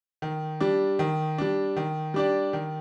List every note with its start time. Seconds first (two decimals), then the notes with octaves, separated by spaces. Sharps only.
0.22 D#3
0.60 G3 D4
0.99 D#3
1.38 G3 D4
1.76 D#3
2.14 G3 D4 G4 D5
2.53 D#3